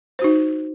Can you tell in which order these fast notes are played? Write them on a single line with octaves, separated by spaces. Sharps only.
C5 F#4 D#4